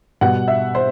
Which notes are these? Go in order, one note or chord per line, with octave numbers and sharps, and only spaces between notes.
B2 G3 B3 F#5
E5
C5